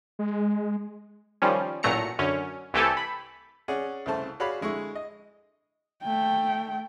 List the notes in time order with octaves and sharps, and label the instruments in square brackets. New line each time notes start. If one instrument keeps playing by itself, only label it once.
[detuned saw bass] G#3
[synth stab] D#3 F3 G3 C#4
A1 A#2 F#3 A3 A#5 C#7
F#2 D3 C#4
C2 E3 A3 G4 A4 G#5
B5
[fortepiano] C#4 G#4 D5 F#5
C2 C#3 A3 C5 A5
F#4 G#4 C#5 D5 F5 B5
D3 G#3 E4 C#6
D#5
[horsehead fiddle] A3 G5